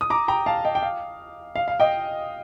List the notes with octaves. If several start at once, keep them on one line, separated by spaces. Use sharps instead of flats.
D#6
A#5 D6
G5 A#5
F5 A5
D#5 G5
G5
F5
F5
F5
D#5 G5